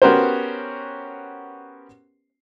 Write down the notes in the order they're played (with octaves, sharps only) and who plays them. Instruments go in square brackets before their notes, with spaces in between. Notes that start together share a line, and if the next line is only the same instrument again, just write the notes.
[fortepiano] B3 C#4 F#4 G4 A#4 C5